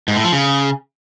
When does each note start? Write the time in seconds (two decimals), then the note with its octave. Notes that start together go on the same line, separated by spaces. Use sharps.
0.08 G#2
0.16 A2
0.24 F3
0.33 C#3